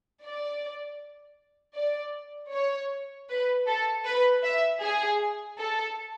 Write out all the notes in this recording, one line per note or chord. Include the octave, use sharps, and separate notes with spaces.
D5
D5
C#5
B4
A4
B4
E5
G#4
A4